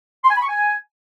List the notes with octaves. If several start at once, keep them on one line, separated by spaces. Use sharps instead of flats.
C6
G#5
B5
C#6
G#5